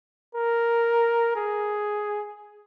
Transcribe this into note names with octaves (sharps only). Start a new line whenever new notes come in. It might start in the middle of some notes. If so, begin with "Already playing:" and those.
A#4
G#4